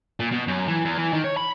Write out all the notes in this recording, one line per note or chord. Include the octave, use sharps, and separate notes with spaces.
A#2
B2
F#2
E3
E2
E3
D#3
C#5
B5